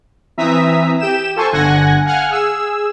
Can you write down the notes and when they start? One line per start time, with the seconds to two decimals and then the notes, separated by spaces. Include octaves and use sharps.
0.37 E3 C4 E5 A#5 D#6 B6
1.00 G4 G5 E7
1.36 F4 A4 C5 G#5 A5 C#6
1.53 G1 D3 F#5 G#5 G#6 A#6
2.05 F5 F#5 G#5 F6
2.30 G#4 E6